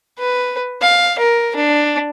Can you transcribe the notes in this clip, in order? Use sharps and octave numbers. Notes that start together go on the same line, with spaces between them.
B4
F5
A#4
D4